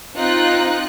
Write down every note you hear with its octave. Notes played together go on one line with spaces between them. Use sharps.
C4 D#4 F4 F#6